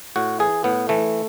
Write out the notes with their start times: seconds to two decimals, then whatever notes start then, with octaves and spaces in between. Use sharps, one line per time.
0.16 A2 F#4
0.40 E3 G#4
0.64 A2 B3
0.89 E3 A3